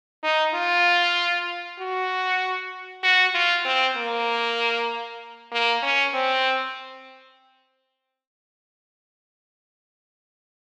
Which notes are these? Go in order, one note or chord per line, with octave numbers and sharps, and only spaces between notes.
D#4
F4
F#4
F#4
F4
C4
A#3
A#3
C#4
C4